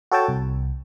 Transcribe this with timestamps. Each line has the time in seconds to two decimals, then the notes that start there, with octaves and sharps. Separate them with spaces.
0.12 F#4 A4 C#5 G5 A5
0.28 C2